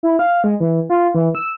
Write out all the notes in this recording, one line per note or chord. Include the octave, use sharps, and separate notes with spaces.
E4
F5
G#3
E3
F4
E3
E6